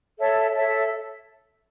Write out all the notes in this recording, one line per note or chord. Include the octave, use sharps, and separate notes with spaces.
A4 C#5 E5 A5
A4 C#5 E5 A5